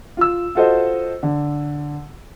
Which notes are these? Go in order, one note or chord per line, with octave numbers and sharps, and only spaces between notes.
F4 E6
F4 F#4 A4 C5 D#5
D3